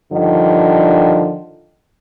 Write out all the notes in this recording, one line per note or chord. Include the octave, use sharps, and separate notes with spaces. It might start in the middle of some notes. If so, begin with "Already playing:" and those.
G2 D3 D#3 F3